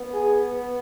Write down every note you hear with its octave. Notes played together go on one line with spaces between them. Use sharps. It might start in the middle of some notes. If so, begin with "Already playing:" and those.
Already playing: B3
G#4